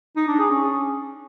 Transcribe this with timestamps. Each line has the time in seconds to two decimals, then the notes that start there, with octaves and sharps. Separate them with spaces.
0.16 D#4
0.28 D4
0.39 G#4
0.50 C#4